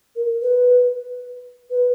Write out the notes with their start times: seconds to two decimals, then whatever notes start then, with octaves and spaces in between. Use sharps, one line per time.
0.16 A#4
0.42 B4
1.70 B4